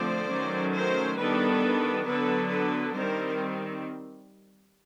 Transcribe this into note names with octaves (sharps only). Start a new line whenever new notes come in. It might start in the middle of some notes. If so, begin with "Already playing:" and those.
Already playing: D3 F3 A3 C4 C5 D5
D#3 F#3 A3 C#4
A#4 C5
D#3 G3 B3 D4 A4 B4
D3 F#3 B3 D4 A4 B4
A4 B4
D#3 G3 C4 A#4 C5